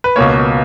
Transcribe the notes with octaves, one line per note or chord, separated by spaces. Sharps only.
B4
C#2 B2 A#3 C#5